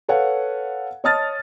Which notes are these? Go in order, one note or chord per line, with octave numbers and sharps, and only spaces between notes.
A4 B4 C#5 F5 F#5
C#5 D#5 A5 D#6 F6 A6